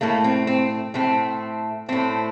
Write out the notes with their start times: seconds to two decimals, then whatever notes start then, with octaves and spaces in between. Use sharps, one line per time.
0.01 A2 A3 A#3
0.24 C4
0.47 C4
0.94 A2 A3 C4
1.89 A2 A3 C4